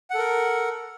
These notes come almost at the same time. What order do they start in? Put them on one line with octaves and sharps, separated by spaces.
F#5 A4 A#4